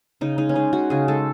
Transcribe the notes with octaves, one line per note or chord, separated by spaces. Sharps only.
C#3 D#4
G#3 D#4
C#4
G#3 D#4
G#3 F#4
C#3 G#4
G#3 A4